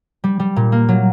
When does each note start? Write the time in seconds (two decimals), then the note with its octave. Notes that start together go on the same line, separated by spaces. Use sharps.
0.24 G3
0.40 G3
0.56 A#2
0.72 A#3
0.89 F#3